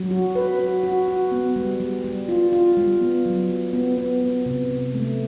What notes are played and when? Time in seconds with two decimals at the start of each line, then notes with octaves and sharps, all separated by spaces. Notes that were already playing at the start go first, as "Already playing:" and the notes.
Already playing: F#3
0.11 F#4
0.35 B4
0.59 F#4
0.83 F#4
1.08 F#4
1.32 B3
1.56 G3
1.80 G3
2.04 G3
2.29 F4
2.53 F4
2.77 G3
3.01 B3
3.26 F#3
3.49 F#3
3.73 B3
3.98 B3
4.22 B3
4.46 C3
4.70 C3
4.94 A3